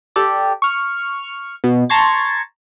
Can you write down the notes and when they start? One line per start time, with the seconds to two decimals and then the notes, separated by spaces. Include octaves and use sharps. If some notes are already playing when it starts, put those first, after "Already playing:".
0.16 G4 A4 D5
0.62 C#6 F6
1.64 B2
1.89 A5 A#5 C6 C#6 G#6 A6